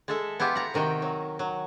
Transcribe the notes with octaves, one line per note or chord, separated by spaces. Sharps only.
G#3 A4 E5
B3 E4 F4 G4
F#5 A#5
C3 D#3 F#4 G5
F#3
F#3